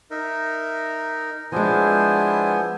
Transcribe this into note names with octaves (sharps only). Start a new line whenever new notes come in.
D#4 A#4 E5
F3 G#3 B3 D4 E4 C5 G#5